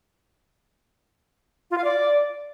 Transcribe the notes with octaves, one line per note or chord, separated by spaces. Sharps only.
F4
F5
D5